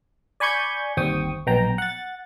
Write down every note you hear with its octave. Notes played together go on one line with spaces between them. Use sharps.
D5 G#5 B5 C#6 G6 G#6
G1 D#2 C4 G5 C#6 D#6
A#1 B2 F#3 G5 A#5
F#5 A6